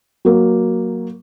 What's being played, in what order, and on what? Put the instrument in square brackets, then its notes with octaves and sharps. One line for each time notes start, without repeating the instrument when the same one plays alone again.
[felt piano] F#3 A#3